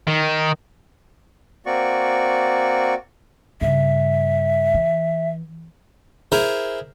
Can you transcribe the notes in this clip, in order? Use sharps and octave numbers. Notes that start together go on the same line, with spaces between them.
D#3
A#3 C4 F#4 D5 C#6
G2 C#3 E5
E3
E4 G#4 A#4 C5